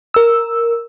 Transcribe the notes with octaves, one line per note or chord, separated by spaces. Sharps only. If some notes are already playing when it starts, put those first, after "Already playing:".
A#4 E6